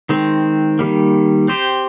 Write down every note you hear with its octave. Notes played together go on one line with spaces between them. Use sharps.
D#3 G#3 C4
D#3 G3 A#3
C4 G4 C5